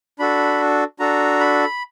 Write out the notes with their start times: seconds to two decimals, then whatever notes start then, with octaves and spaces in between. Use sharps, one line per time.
0.19 D4 F#4 A4 B5
1.00 D4 F#4 A4 A#5
1.40 B5